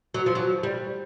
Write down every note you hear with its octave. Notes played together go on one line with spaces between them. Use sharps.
F#3
F3
F#3
G3